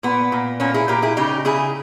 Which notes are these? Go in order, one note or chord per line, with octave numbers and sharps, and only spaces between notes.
A#2 B3
A#2
A#2 A#3 C#4
E4 G#4
A#2 G4 A#4
E4 G#4
C#3 D#4 G4
C#3 E4 G#4